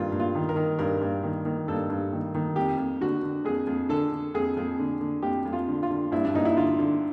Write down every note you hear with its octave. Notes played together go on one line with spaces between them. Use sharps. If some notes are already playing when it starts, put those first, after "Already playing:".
Already playing: G2 D#3 F4
G2
F4
D#3
A#4
D#3
G2 A#4
G2
D#3
D#3
G2 A4
G2
D#3
D#3
F2 G4
F2
D3 F#4
D3
F2 G#4
F2
D3 A4
D3
F2 G#4
F2
D3
D3
F2 G4
F2
F4
D3
F4
D3
G2 E4
D4
G2 D#4
E4
D3 F4
D3